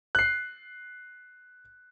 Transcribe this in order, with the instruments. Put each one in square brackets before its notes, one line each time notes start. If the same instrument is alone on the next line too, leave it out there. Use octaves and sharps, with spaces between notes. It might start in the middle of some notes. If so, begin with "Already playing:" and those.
[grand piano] F#6 C7